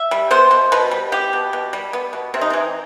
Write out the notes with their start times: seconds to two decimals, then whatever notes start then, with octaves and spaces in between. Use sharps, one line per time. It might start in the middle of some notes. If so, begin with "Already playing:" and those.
Already playing: E5
0.11 G3
0.31 B3 C5
0.51 B2
0.72 B2 B4
0.91 G3
1.12 B3 G4
1.33 B2
1.53 B2
1.73 G3
1.93 B3
2.13 B2
2.34 C3 C4
2.41 D#4
2.50 E3 C4